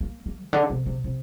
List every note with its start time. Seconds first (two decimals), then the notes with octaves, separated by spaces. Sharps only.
0.01 A#3
0.26 A#3
0.44 C3
0.53 D3
0.70 C3
0.86 C3
1.04 C3